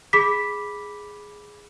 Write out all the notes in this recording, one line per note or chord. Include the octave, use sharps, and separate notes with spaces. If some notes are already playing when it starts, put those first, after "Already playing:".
G#4 B5 D6 B6